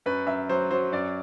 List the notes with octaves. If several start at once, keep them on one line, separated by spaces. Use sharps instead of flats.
F#2 B4
F#2 E5
F#3 C5
F#3 C5
F#2 D5